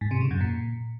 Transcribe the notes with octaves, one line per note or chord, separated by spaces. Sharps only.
G#2
C3
C#3
F#2
A#2